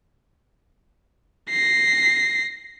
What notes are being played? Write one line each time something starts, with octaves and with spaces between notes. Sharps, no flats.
A#6 C7